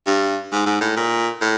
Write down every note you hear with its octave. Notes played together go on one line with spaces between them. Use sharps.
G2
G#2
G#2
A2
A#2
A2